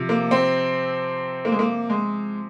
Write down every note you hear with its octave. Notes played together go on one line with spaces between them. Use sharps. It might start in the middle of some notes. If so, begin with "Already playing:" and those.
Already playing: C3 F3
A#3
C4
A#3
G#3
A#3
G#3